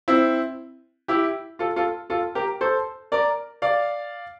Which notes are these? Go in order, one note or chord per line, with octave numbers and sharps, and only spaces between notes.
C4 E4
E4 G4
F4 A4
F4 A4
F4 A4
G4 A#4
A4 C5
A#4 D5
D5 F5